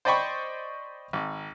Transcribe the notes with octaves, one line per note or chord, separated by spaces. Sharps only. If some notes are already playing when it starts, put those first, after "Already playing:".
C5 D5 D#5 G5 B5 C#6
G#1